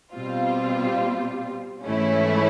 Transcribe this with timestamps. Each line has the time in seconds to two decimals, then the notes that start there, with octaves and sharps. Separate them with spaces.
0.14 B2 G3 C4 F4
1.86 G#2 E3 A3 C#4 E4